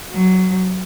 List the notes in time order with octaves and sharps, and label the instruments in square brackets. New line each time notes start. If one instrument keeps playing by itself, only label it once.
[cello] F#3